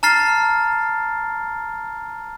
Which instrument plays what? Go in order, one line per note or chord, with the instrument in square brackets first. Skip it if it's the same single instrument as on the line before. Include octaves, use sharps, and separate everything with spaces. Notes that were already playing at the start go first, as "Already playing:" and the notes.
[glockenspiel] A5 A#5 F6 A6 C7